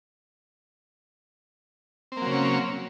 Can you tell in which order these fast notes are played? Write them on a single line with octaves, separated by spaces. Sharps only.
C4 A#3 F#3 C#3 C#4